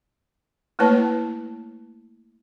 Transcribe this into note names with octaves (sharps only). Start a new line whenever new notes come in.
A3 A#3 E4 B4 C#5 A5